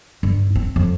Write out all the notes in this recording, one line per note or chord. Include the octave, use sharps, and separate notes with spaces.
G2
C4
F2